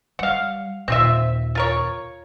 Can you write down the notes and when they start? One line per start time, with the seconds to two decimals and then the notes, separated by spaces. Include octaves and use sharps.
0.19 G3 F5 F#5
0.88 D#2 A#2 C4 F4 E5
1.55 F4 A#4 C#5